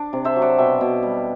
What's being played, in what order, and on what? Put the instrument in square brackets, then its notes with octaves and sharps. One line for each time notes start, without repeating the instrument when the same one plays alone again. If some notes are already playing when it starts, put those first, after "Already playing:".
Already playing: [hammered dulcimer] D4 D5
C3
C5 E5
F#3
D5 F#5
B2 E5 G5
B2
G3